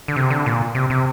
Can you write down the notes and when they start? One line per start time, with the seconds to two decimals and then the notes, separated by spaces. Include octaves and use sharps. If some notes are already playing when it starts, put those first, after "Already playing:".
0.08 D3
0.16 C3
0.30 D3
0.46 A#2
0.75 C3
0.90 C3